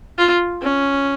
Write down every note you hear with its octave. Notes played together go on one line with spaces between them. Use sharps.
F4
C#4